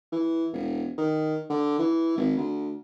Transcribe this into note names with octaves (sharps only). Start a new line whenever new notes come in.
E3
E1
D#3
D3
E3
G#1
D2